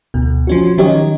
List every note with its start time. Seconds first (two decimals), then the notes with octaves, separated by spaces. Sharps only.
0.14 D2 B2
0.47 F3 C#4 F#4
0.78 D#3 F#3 C#4 G4 C#5 D#5